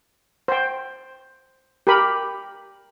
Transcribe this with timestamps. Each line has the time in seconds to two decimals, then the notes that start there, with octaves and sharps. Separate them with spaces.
0.48 C5 G5
1.87 G4 A#4 B5